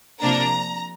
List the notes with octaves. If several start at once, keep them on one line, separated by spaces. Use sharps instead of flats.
C3 F3 A#3 D4 A#5